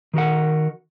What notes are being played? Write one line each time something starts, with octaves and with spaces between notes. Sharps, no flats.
D#3 F#4 A#4 F#5